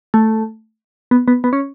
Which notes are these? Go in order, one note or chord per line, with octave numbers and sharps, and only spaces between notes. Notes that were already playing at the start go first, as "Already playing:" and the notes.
A3
B3
B3
B3
C#4